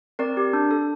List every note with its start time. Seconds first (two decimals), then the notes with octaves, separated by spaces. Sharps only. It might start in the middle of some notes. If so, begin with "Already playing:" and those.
0.19 C4 A#4 D5
0.37 G4
0.53 D4
0.71 A4